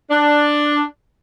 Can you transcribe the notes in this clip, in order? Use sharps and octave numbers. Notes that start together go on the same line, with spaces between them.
D4